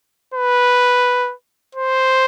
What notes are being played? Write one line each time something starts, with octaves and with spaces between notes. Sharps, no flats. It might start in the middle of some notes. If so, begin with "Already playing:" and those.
B4
C5